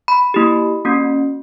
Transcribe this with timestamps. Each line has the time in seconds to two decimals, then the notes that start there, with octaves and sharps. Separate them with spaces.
0.08 B5
0.34 A#3 E4 G4
0.85 A#3 C#4 F#4